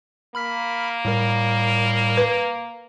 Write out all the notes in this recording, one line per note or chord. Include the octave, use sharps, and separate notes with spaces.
A#3 B5 F6 B6
A2 G3 A#4
B4